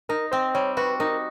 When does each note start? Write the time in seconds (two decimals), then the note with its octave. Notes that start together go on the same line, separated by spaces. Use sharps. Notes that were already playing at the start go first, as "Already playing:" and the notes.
0.09 D#4 A#4
0.32 C4 C5
0.55 G3 C#5
0.77 F#4 B4
1.00 D#4 A#4